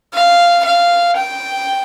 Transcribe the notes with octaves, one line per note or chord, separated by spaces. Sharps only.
F5
F5
G5